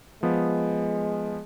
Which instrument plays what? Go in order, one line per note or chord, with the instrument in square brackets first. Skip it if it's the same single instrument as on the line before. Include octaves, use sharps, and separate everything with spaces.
[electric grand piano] F3 B3 [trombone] G#3